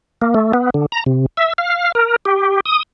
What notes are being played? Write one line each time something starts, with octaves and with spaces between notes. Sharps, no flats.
A#3
A3
B3
D3
A#5
C3
E5
F5
A#4
G4
D#6